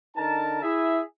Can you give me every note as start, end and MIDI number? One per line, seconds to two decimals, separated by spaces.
0.16 0.58 50
0.16 0.58 63
0.16 0.58 70
0.16 0.58 81
0.62 1.00 64
0.62 1.00 68
0.62 1.00 76